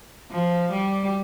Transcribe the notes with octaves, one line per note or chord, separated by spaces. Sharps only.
F3
G3